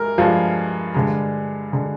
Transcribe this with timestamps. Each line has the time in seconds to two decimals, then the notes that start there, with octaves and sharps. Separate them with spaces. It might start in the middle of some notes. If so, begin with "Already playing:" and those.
Already playing: G2 G#3 A#4
0.18 G2 F3 G#3
0.94 G2 D3 G#3
1.72 D3 G#3